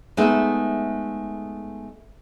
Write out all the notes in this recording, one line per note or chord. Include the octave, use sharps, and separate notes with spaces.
G#3 A3 B3 D#4 E5